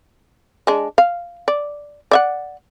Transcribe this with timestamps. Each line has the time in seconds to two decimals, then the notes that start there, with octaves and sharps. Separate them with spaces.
0.67 G#3 D4
0.98 F5
1.48 D5
2.11 D5 E5 F#5